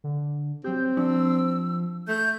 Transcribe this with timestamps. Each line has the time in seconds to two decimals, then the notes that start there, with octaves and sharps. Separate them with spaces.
0.04 D3
0.64 F#3 C4 G4 G6
0.97 F3 D4 E6
2.08 A3 G6